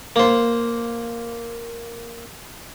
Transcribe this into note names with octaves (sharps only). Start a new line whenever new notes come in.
A#3 C5